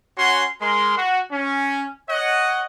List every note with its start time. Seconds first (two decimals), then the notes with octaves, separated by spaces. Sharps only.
0.18 C#4 F#4 C#5 F#5 G#5 C6
0.62 G#3 A#4 C6
0.98 F#4
1.32 C#4
2.10 C#5 D#5 F#5